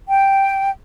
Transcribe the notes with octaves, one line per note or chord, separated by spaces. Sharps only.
G5